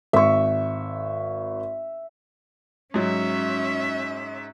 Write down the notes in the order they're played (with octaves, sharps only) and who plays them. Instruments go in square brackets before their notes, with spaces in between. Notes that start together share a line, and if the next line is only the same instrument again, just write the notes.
[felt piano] G#1 C#6 [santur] E5
[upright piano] G#2 F#3 [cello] C#4 E5